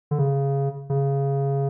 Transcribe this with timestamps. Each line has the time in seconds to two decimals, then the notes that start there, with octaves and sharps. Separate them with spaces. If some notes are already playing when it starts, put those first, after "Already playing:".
0.11 D3
0.19 C#3
0.90 C#3